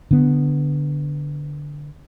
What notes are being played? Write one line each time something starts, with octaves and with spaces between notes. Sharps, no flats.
D3 B3